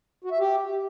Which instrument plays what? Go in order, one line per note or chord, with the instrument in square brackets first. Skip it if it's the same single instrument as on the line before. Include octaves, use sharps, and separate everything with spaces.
[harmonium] F#4
E5
G4